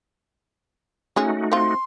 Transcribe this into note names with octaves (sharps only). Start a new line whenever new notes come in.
G#3 A3 C#4 D#4 F#4 G#4
C4 F4 C6